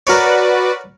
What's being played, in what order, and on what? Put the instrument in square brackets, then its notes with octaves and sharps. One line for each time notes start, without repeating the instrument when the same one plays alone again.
[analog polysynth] F#4 B4 D5 [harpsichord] A#4 C#5